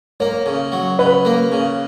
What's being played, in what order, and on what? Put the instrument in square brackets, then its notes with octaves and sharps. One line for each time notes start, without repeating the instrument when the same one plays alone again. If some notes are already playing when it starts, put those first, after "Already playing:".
[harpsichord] A#3 [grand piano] C#5
[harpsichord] C#3
F#3
[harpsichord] C#3 [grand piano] B4
[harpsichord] A#3
C#3